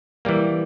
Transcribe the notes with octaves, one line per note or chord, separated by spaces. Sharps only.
E3 G3 A#3